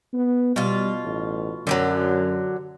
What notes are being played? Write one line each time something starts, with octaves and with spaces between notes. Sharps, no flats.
B3
B2 G3 F4
A1
F#2 D3 F3 F#3